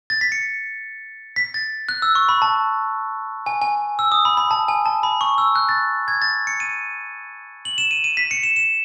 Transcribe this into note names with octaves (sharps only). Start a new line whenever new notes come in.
A6
B6
C#7
B6
A6
F#6
E6
C#6
B5
A5
G#5
G#5
E6
D#6
B5
B5
A5
G#5
A5
B5
C#6
E6
F#6
A6
G#6
A6
C#7
D#7
F#7
E7
D#7
D#7
B6
C#7
E7
E7